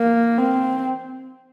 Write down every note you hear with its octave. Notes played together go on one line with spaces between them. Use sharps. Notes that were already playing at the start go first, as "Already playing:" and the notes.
Already playing: A#3
C4